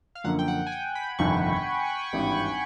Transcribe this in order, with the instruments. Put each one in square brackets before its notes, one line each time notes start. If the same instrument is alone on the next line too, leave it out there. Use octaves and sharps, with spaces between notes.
[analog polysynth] F5
[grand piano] F#2 D3 F3 A#3 [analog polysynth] F#5
[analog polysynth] G5
F#5
G#5
G5
B5
[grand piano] G1 F2 C3 D#3 [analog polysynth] C#6
[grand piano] G#1 G2 E3 G3 C4